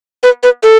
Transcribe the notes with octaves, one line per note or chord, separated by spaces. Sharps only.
B4
B4
A4